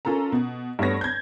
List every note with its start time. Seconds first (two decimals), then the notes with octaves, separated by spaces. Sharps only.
0.05 C#4 F4 A4 A#4 A#5
0.32 B2
0.79 G2 A3 B3 C#5 A#6
1.01 G6 G#6